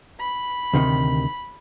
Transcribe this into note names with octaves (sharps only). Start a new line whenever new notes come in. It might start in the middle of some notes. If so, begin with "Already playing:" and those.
B5
D2 C3 D#3